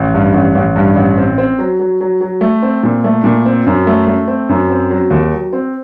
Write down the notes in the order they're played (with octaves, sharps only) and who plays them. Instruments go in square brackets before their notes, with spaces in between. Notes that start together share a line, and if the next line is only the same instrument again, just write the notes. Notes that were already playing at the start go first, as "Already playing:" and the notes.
Already playing: [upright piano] A1
G2
A1
A1
G2
A1
C4
C4
F#3
F#3
F#3
F#3
A3
C4
A#2
A3
A#2
C4
F#2
A3
A3
C4
F#2
C4
F#3
D#2
F#3
C4